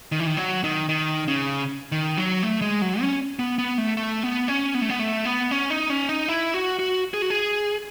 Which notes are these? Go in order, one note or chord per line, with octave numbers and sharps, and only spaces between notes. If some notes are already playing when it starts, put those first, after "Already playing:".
D#3
E3
D#3
F#3
D#3
D#3
C#3
D#3
F#3
A3
G#3
F#3
C#4
B3
B3
A3
A3
B3
C#4
B3
A3
B3
A3
B3
C#4
D#4
C#4
D#4
E4
F#4
F#4
G#4
F#4
G#4